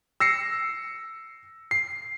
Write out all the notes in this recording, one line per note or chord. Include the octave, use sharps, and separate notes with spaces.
E6 A#6 C7 C#7
C7